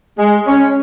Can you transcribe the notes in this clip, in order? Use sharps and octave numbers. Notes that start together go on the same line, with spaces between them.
G#3
C#4